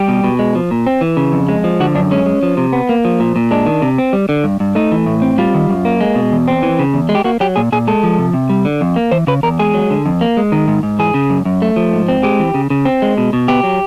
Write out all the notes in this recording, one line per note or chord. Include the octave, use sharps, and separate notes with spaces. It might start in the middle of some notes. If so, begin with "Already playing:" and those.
Already playing: G3 G4
B2
B2
G#3
F3
A#2
C4
E3
C#3
F2
G#3
F3
D3 F#4
F#2 D4
G#3 C#4
G#3
F3
C3
B3
A#3
F3
A#2
A#2
G#3 D4
D#3
C3
C4
G3
D3
G2
G2
A3 D#4
E3
A2
C4
G3 F4
D#3
F#2
A#3
G#3
B2
E2
C4
E3
C#3
E2
G#3
G4
A#3 F#4
F#3 G4
A#2 G#4
A#2 G#4
G#3 A4
F3
C3
C3
G3
D3
F2
A#3
E3 C5
C#3 B4
E2 A#4
G#3 G#4
F#3
D3
F2
A#3
G#3
D#3
G#2
G#2
E3 G#4
C#3
F#2
F#2
A3
F3
G#2
C4
G#3 G4
E3
C#3
C#3
C4
G#3
B2
B2
B3 G4
F#3